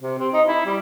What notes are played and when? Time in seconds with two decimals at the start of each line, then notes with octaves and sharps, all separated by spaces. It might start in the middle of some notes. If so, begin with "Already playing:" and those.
0.01 C3
0.19 C4
0.33 D#4
0.47 E4
0.66 G3